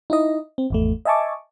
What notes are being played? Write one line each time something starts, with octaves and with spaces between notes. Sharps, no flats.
D#4 E4 D#5
C4
G#1 E2 A3
D#5 E5 G#5 A5 C#6 D6